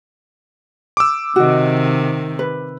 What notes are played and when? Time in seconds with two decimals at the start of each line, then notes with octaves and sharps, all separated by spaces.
0.97 D6 E6
1.36 C3 D#3 F#4 D#5
2.39 B4